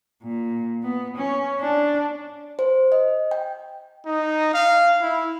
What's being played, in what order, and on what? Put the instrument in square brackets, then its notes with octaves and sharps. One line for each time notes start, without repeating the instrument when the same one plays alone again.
[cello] A#2
B3
C#4
D4
[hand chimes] C5
D#5
G5
[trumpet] D#4
F5
E4